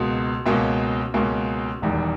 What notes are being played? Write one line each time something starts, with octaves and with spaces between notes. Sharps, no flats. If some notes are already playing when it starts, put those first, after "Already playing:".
Already playing: C#2 B2 A#3
C#2 B2 A#3 C#4
C#2 B2 A#3 C#4
E1 E2 D#3 G3